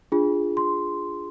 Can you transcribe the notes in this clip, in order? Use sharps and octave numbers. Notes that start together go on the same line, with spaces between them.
D4 F4 G#4
C6